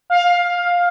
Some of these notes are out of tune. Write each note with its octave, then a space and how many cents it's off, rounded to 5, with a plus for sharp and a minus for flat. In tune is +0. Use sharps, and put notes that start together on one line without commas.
F5 +15